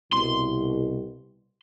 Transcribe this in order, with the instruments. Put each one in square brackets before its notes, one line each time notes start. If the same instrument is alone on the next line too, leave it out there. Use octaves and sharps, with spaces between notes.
[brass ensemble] C2 B2 [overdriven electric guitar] C6